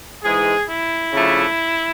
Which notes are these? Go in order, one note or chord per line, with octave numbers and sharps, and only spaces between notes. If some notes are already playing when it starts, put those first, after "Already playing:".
G#2 E3 G#3 G#4
E4
C#3 F3 A3 D4